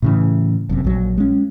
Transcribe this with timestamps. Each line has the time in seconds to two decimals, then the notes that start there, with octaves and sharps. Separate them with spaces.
0.02 A2 C#3 E3
0.69 F#1 F#2 C3
0.85 A#1 F#3
1.18 G#3 C#4